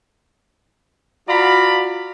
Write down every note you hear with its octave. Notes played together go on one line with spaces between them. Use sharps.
F4 F#4 D5 F5 A#5 B5